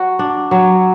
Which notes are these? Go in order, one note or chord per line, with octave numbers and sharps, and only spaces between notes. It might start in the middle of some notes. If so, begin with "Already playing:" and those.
Already playing: F#3 F#4
D4
F#3